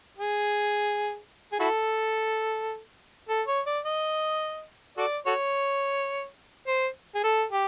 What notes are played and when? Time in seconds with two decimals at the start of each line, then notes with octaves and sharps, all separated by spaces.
0.18 G#4
1.53 G#4
1.60 E4 F#4 A4
3.29 A4
3.48 C#5
3.66 D5
3.85 D#5
4.98 F#4 A4 D5
5.26 F#4 A4 C#5
6.67 C5
7.15 G#4
7.24 A4
7.52 G4